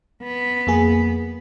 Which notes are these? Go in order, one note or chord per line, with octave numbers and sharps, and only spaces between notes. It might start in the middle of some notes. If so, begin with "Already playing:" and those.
B3
F2 A#3 G#4